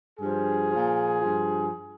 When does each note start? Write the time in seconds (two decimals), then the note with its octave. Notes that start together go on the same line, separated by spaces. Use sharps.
0.19 G2 F3 G#4
0.69 A#2 F3
1.19 G2 F3